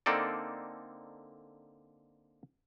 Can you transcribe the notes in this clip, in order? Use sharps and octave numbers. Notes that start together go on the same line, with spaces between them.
D3 A#3 C4 D#4 A4 D5